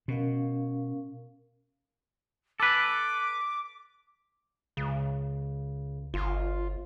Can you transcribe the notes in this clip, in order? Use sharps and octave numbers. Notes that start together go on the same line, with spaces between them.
B2 C#4 A#4 F5
A4 B4 D6
C#2 C#3
G1 F4